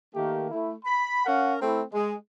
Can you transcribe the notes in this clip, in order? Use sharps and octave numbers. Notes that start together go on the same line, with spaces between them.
D#3 A3 A#3 G4
A3 E4
B5
C#4 A#4 F5 F#5
A3 C4 E4 A4
G#3